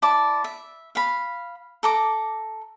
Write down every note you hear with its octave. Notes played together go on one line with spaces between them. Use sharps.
E4 D5 A5 D6
E5
F5 B5
A4 A#5 D6